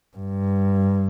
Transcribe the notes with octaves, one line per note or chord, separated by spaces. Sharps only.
G2